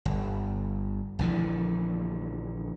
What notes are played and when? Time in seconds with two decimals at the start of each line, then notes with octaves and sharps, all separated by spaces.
0.05 G1
1.19 A#1 D3 E3 F3